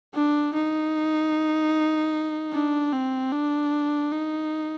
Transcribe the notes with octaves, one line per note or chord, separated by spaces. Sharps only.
D4
D#4
D4
C4
D4
D#4